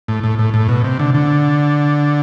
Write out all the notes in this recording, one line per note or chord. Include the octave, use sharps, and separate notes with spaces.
A2
A2
A2
A2
B2
C3
D3
D3